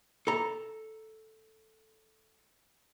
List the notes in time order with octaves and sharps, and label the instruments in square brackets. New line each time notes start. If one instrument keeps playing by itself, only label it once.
[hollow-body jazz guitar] A4 A#5